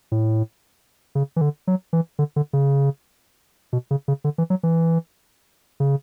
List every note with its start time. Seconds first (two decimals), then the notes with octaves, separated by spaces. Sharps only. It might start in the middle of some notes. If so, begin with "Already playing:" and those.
0.12 A2
1.15 C#3
1.36 E3
1.41 D3
1.67 F#3
1.93 E3
2.19 D3
2.36 D3
2.53 C#3
3.73 B2
3.91 C#3
4.08 C#3
4.24 D3
4.38 E3
4.50 F#3
4.63 E3
5.80 C#3